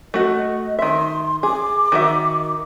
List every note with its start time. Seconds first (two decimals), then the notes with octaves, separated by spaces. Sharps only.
0.14 A3 F#4 D#5
0.79 D#3 E5 C6
1.43 G#4 D6
1.92 D#3 F#4 E5